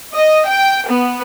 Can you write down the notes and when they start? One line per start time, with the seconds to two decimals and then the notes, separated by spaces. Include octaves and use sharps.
0.14 D#5
0.48 G5
0.88 B3